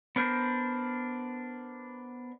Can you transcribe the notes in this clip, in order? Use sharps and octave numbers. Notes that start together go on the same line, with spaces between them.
B3 D4 A#4 C5